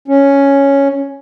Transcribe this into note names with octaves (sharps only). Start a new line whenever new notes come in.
C#4